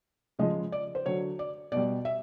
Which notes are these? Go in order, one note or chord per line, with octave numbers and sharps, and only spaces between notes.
C#3 F3 G#3 D#5
D5
C5
D3 F#3 C#5
D5
B2 G3 D5
E5